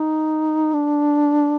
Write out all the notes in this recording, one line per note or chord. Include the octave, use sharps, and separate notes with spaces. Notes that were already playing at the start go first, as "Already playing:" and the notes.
Already playing: D#4
D4